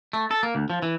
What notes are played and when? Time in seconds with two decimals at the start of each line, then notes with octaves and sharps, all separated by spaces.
0.13 A3
0.31 A4
0.43 A#3
0.55 D2
0.70 F3
0.82 E3